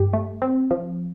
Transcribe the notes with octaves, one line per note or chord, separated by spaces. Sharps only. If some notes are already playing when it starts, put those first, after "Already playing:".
Already playing: G2 G4
A3
C4
F3